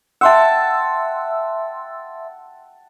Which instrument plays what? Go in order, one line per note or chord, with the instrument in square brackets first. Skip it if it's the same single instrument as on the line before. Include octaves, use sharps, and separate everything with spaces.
[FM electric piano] E5 C6 E6 [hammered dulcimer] F#5 G5 A5